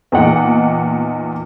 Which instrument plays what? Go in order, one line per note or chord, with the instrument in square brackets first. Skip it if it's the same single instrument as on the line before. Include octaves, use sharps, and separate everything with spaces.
[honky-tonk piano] E2 A#2 D#4 F#5 G5